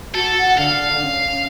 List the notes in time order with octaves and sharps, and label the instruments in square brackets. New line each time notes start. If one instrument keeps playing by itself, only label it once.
[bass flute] F#4 [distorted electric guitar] A4
[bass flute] F#5
[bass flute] D3 [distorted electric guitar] F5
[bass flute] C#4